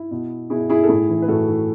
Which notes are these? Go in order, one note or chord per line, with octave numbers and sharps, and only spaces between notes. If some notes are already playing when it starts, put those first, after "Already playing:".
Already playing: E4
B2
B2 E4 G#4
E4 G#4
A4
A2 E4 G#4
E3
B4
A2 F#4 A4
E3